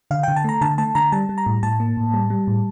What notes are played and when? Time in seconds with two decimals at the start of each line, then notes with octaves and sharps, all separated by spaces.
0.11 D3 F5
0.23 D3 G5
0.36 A5
0.44 A3 A#5
0.61 D3 A5
0.78 A3 A5
0.95 D3 A#5
1.12 G3 A5
1.29 G3
1.38 A#5
1.46 A2
1.63 A2 A5
1.80 A#3
1.97 A2
2.14 G3
2.30 G3
2.47 A2